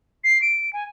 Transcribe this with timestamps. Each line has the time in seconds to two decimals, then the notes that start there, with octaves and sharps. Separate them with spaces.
0.24 C7
0.42 D7
0.73 G#5